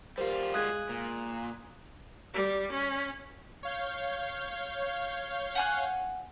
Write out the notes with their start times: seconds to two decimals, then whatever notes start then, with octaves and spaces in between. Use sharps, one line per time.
0.18 G3 F4 G4 A#4 C5
0.54 G#3 G#4 F5 D#6 F#6 G#6
0.89 A#2
2.34 G3
2.72 C#4
3.63 C#5 F5 G6
5.55 F#5 G#5 F#6